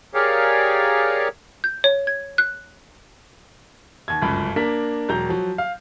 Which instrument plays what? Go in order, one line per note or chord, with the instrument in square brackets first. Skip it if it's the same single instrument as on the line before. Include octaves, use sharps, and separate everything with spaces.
[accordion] G4 G#4 A#4 C#5 D5 F5
[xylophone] G6
C#5
G#6
F#6
[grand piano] D#2 G#6
G1 C#2 F#2 B5
A#3 D4 A#4 B6
E1 F#3 A#5 G6
F3 F#3
F5